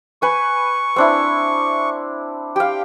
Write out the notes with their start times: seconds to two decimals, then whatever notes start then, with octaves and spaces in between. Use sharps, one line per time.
0.22 B4 G#5 C#6
0.96 C4 D4 E4
2.56 G4 F5 G5